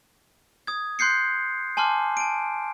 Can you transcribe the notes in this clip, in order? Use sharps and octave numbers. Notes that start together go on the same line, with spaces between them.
D#6 G#6
C6 F#6 G6 C7 C#7
G#5 A5 C6 D6 F6
A5 D7